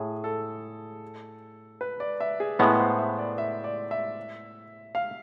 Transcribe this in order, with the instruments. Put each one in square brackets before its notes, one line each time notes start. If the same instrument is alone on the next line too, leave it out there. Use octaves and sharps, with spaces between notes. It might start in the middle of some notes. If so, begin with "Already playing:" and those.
Already playing: [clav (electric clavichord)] A2 [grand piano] G#4
[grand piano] A4
B4
D5
E5
G#4
[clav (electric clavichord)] A2 G#3 B3 [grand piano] B4
[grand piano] C5
E5
D5
E5
D5
E5
F5